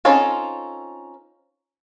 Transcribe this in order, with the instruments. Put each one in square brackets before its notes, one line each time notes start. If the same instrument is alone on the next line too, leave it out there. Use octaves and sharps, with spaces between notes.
[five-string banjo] C4 C#4 D#4 F4 A4